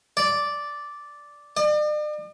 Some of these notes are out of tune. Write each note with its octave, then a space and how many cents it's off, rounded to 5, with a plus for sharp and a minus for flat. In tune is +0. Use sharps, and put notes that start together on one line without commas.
D5 -5
D5 +45